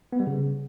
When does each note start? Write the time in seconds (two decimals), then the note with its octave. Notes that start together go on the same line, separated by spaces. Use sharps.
0.12 B3
0.20 G3
0.27 C#3